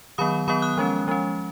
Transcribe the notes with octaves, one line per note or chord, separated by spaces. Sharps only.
D#3 F#3 B3 B5 D#6
D#3 F#3 B3 B5 D#6
D#6 F#6
F3 G#3 C#4
F3 G#3 C#4